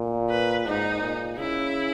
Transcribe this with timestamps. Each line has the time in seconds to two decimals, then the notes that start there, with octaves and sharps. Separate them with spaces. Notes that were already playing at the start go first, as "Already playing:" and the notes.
Already playing: A#2
0.29 B4
0.66 G#2 D#4
1.01 A#2
1.37 C#3 E4